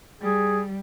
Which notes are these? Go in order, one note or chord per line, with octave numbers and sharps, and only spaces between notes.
G3 G#4